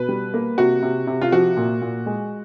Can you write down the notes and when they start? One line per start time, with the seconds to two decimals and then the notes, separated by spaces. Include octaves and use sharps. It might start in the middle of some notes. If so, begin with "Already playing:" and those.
Already playing: B2 B4
0.09 G3
0.34 A#3
0.58 C3 F#4
0.82 C3
1.07 C3
1.21 F4
1.32 F3 F#4
1.57 A#2
1.81 A#2
2.06 G#3